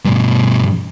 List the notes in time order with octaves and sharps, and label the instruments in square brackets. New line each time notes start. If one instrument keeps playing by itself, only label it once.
[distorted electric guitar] G2 B2